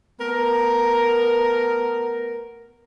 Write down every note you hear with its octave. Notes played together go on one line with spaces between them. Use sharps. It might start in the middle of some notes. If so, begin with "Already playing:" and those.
A3 B3 A#4